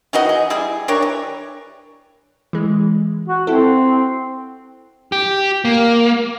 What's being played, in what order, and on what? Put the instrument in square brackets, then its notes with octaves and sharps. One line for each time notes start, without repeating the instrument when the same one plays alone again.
[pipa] D#3 E3 F#4 D#5
G#4
G3 E4 G#4
D4 G4 A#4 C#5
E3
[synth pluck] E3 G#3
[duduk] F#4
[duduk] C4 [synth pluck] E4 A4
[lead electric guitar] G4
A#3